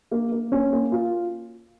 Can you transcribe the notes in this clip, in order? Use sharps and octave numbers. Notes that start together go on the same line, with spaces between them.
A#3
A#3
C#4
A#3
F4